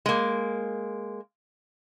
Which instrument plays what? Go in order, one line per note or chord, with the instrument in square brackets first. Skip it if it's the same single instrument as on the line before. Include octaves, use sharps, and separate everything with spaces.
[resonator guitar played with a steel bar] G#3 A#3